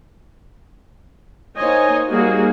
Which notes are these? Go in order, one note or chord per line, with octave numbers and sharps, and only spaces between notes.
A#3 D#4 C5 C#5 D#5 G#5
G3 A#3 D#4 F#4 G#4